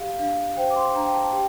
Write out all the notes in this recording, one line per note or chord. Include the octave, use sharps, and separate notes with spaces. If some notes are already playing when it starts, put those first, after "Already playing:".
Already playing: G4 F5
D4 F5
C5 G5
D6
C6
D4 A#5
G5
A5
G4 G5